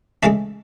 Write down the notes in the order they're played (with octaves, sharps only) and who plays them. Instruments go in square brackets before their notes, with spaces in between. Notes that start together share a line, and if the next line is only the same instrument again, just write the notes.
[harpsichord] C#3 E3 G#3 A3 A4